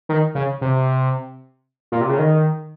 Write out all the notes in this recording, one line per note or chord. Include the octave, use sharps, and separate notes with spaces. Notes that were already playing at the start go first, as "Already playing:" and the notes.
D#3
C#3
C3
A#2
C3
C#3
D#3